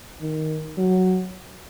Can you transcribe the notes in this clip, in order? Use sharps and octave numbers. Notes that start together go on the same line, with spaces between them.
D#3
F#3